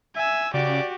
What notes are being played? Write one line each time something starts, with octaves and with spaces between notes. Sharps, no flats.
E5 G#5 E6
C#3 F#4 G4 D5